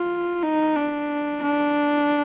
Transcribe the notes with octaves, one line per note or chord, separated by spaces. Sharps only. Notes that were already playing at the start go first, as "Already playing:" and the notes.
Already playing: F4
D#4
D4
D4